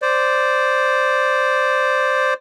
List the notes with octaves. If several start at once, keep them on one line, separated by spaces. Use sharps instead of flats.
C5 D5